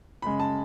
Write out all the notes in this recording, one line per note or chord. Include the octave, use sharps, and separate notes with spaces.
F#2 C#3 G#3 B5
A5